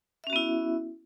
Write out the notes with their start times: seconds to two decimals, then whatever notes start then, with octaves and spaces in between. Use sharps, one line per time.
0.24 E5
0.27 C#4
0.30 F#4
0.33 B3
0.36 E4